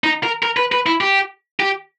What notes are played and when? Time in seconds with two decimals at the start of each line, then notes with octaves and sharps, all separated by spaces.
0.04 D#4
0.23 A#4
0.43 A#4
0.57 B4
0.72 B4
0.86 E4
1.01 G4
1.60 G4